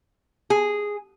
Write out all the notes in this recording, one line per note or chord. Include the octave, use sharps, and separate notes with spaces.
G#4